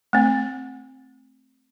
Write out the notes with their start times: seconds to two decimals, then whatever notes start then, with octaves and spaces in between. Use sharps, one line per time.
0.13 A3 C4